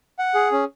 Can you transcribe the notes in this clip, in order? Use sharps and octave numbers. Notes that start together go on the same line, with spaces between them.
F#5
G#4
C#4